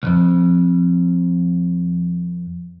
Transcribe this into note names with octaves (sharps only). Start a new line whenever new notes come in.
C2 F2